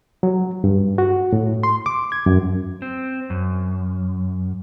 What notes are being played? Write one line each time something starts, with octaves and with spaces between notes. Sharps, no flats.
F#3
G2
F#4
A2
C6
D6
G#6
F#2
C4
F#2